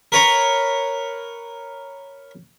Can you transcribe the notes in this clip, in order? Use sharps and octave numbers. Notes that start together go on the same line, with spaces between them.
A#4 B4 C#5 A#5 B5